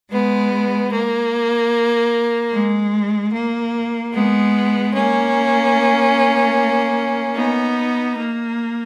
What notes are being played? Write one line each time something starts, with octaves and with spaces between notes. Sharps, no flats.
G#3 B3
A#3
G#3
A#3
G#3 B3
A#3 C#4
B3 D#4
A#3